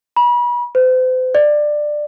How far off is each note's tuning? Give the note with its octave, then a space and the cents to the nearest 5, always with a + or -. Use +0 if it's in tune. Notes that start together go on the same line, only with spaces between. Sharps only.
B5 -35
C5 -40
D5 +15